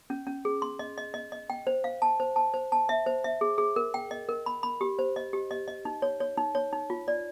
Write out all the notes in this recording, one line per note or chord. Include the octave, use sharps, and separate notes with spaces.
C#4
C#4
G#4
C6
D#5
D#5
D#5
D#5
G5
C5
F5
A5
C5
A5
C5
A5
E5
C5
E5
G#4
G#4
A#4
G5
D#5
A#4
B5
B5
G4
C5
D#5
G4
D#5
D#5
D#4
C#5
C#5
D#4
C#5
D#4
F4
D5